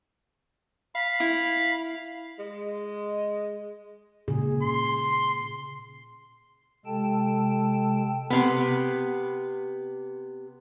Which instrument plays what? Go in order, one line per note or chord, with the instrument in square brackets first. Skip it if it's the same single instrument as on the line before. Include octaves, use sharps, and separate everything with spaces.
[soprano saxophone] F5 [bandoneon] B5
[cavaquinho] E4
[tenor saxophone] G#3
[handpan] A#2 C#3 G#4
[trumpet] C6
[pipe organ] C3 G#3 A4 G5 A5
[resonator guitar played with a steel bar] C3 B3